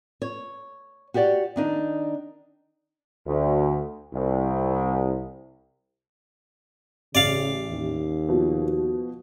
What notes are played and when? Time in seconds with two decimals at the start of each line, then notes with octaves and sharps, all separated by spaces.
0.22 C#5
1.14 F#4 G4 C#5 D5 F#5
1.56 D#3 D4 D#4
3.27 D2
4.13 C2
7.15 A1 C#3 D5 F5
7.71 D#2
8.29 B2 F3